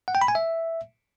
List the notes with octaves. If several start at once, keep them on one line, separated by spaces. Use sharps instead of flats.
F#5
G5
B5
G#5
E5